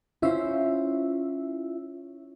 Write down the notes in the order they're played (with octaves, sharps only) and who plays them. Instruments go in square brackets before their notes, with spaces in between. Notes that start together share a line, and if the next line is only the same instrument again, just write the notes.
[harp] C#4 C5 [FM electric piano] E4 F4 E5